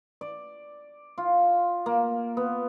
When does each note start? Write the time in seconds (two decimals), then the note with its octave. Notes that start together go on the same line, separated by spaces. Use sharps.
0.21 D5
1.18 F4
1.86 A#3
2.37 B3